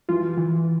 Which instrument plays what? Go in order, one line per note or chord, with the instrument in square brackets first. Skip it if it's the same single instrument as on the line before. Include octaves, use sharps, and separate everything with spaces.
[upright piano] E3 [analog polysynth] F4
[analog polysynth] E3